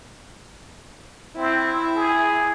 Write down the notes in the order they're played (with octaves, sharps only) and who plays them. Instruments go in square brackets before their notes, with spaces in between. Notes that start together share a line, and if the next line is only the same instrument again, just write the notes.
[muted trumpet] C4 [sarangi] E4
[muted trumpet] G#4